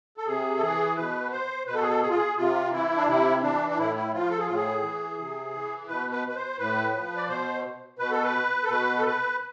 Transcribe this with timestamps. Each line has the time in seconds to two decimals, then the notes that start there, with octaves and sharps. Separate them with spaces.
0.17 A4
0.26 C3 G#4
0.57 A4
0.62 E3 G#4
0.96 B2 B4
1.32 C5
1.67 B2 B4
1.74 A4
1.81 G#4
1.89 A4
2.01 G#4
2.10 F4
2.16 G#4
2.37 C3 F4
2.72 E3 E4
2.96 D4
3.07 C3 E4
3.42 E3 D4
3.70 D4
3.77 A2 E4
3.96 E4
4.12 F3 F4
4.30 A4
4.39 G#4
4.46 A2 F4
4.54 G#4
4.82 E3
5.19 C3
5.54 E3
5.88 B2 B4
6.12 B4
6.28 B4
6.36 C5
6.58 A2 B4
6.93 F3
7.17 D5
7.28 B2 C5
7.99 B2 B4
8.11 A4
8.23 B4
8.64 A4
8.69 B2 B4
8.99 A4
9.05 B4